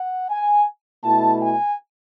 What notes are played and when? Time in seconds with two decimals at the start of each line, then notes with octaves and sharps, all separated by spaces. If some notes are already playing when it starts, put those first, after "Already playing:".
Already playing: F#5
0.30 G#5
1.04 B2 A3 E4 A5
1.41 G#5